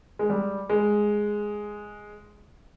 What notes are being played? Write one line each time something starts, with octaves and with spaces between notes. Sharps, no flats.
G#3
G3
G#3